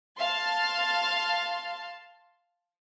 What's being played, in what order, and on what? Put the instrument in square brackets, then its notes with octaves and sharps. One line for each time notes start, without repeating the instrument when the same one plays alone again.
[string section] F5 A5 C6